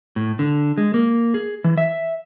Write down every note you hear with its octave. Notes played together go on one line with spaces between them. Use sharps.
A2
D3
G#3
A#3
G#4
E3
E5